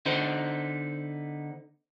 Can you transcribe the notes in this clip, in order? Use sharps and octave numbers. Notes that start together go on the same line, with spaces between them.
D3 B3 D#4 C5